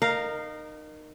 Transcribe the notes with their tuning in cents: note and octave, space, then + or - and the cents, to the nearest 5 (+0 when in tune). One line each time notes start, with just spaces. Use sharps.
D#4 -25 A#4 +0 F5 +0